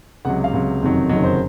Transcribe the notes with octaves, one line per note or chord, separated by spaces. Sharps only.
C#2 C3 F#3 F#5
F5
C#2 C3 F#3
F#1 F2 C3 D#3 F#3
F#1 F2 C3 D#3 F#3 D#5
C5